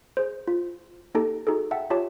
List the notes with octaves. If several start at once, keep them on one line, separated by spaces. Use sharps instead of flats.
G#4 C5
F4
A#3 D#4 G4 A4 A5
D#4 F#4 G#4 A4
E5 F#5 G5 A5 E6
F4 G4 C#5 E5 A5 D6